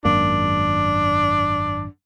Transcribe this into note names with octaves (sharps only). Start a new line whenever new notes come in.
G#1 F#2 A#3 D4